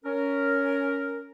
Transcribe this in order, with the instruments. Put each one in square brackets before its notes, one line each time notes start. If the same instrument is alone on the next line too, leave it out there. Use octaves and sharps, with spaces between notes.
[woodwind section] C#4 A#4